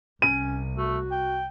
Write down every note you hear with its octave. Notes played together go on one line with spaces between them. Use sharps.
C2 C#4 D#7
A3 F#4
G5